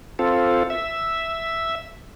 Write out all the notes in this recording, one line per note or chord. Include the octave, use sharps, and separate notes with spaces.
C4 F4 A4
E5